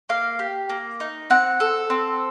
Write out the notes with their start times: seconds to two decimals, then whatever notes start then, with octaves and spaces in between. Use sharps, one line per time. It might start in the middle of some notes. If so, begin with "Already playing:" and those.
0.09 A#3 F5
0.39 G4
0.69 A#3
1.00 D#4
1.30 C4 F#5
1.60 A4
1.90 C4